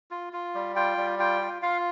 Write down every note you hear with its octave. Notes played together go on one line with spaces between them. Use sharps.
F4
F4
G3
F4 G5
G3
F4 G5
F4
F4 F5